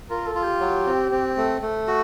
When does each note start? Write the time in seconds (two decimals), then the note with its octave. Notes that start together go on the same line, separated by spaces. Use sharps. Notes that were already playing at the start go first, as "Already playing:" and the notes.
0.10 F4 A#4
0.27 A4
0.35 F4
0.44 G4
0.61 F#3
0.86 C4
1.11 C4
1.37 A3
1.62 A3
1.88 F#4